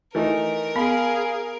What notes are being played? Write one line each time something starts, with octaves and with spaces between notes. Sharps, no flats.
E3 A3 D#4 A#4
B3 G#4 F5 B5